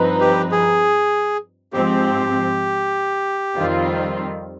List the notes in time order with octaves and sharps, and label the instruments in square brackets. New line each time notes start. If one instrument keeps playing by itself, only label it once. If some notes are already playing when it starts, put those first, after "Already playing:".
Already playing: [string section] G2 F3 C4 D#4 B4
[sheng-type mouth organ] G4
G#4
[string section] G#2 F3 C4 [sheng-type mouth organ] G4
[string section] F2 D#3 G3 C4 F4